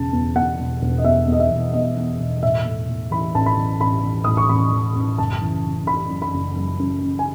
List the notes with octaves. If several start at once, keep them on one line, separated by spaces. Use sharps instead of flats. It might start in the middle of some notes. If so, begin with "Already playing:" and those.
Already playing: E1 C#3 A5
E2
E2 F#5
E1
E1
D#5
E2 E5
E2 D#5
E5
E1
E2 D#5
E2
E1
A2 E5
A2
A2
E3 B5
A1 A5
B5
E3
A1 B5
E3
A2 D#6
C#6
A1 B5
E3
A1
F#1 A5
E3
C#3
C#3 B5
F#2
B5
F#1
F#2
F#2
C#3
G#5